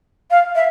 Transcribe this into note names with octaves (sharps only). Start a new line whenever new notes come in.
F5
E5